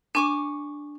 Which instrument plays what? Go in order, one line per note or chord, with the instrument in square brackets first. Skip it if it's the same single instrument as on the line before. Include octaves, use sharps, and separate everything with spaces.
[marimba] D4 [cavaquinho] G#5 C#6 D6